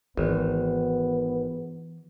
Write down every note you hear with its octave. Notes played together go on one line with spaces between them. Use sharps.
G#1 E3 B3